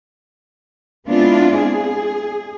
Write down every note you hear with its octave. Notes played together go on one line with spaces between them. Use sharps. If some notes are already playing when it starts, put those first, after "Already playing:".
G#3 B3 C4 D4 E4 F4
G#4